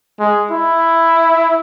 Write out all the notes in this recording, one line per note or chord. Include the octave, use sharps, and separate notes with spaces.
G#3
E4